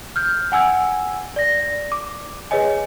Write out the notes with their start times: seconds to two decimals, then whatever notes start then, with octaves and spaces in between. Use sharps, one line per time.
0.16 F6 G6
0.52 F#5 G#5 E6 G#6
1.36 D5 A#6
1.92 D6
2.51 G#4 B4 C#5 D#5 G#5